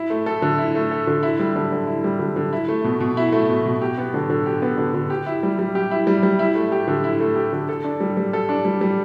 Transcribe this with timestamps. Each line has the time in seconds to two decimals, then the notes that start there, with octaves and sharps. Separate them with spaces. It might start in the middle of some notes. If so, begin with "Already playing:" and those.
Already playing: E4
0.10 A3
0.26 A4
0.42 D3
0.58 E4
0.75 A3
0.91 A4
1.07 D3
1.23 E4
1.39 G3
1.56 D3
1.72 D3
1.87 E4
2.04 G3
2.19 D3
2.36 D3
2.53 E4
2.69 A3
2.84 B2
3.00 B2
3.17 E4
3.32 A3
3.49 B2
3.65 B2
3.82 G4
3.98 B3
4.14 D3
4.30 D3
4.46 G4
4.62 B3
4.77 D3
4.94 D3
5.10 G4
5.26 E4
5.43 G3
5.59 G3
5.75 G4
5.91 E4
6.07 G3
6.23 G3
6.39 E4
6.55 A3
6.72 G4
6.88 D3
7.04 E4
7.20 A3
7.36 G4
7.53 D3
7.69 A4
7.84 D4
8.01 G3
8.17 G3
8.33 A4
8.49 D4
8.65 G3
8.81 G3